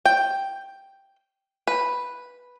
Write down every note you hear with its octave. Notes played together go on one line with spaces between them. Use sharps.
G5
B4